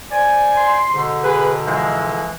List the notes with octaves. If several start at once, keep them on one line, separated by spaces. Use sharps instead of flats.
C5 D5 G#5
C6
G#2 B2 D3
G#4 B4
E3 F3 G#3